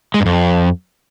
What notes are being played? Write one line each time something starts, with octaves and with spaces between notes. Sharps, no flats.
G#3
G2
F2